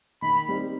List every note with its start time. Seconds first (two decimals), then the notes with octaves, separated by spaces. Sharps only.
0.22 D#3 B5
0.48 G3 C4 D#4